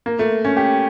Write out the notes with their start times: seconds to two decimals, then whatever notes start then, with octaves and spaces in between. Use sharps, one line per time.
0.06 A#3
0.19 A3
0.45 C#4
0.57 G4